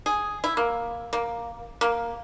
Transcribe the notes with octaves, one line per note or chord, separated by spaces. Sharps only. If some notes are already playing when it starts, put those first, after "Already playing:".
G#4
E4
A#3
A#3
A#3